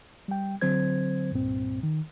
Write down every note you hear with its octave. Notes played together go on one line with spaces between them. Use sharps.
G3 G5
D3 F#3 C4 C5 G#6
C2 G2 A#2 C4
D#3